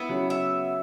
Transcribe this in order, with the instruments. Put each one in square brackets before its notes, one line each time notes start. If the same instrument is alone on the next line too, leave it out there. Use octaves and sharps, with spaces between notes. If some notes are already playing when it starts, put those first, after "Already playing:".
Already playing: [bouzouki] B3 E4
[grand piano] C#3 F#3
[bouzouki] E5